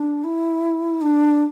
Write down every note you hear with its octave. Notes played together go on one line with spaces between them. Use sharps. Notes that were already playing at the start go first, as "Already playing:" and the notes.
Already playing: D4
E4
D4